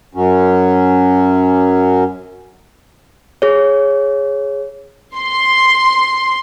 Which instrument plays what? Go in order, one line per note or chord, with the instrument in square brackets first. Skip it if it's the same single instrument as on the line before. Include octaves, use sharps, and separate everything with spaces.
[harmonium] F#2 F#3 C#4
[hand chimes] G#4 C#5
[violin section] C6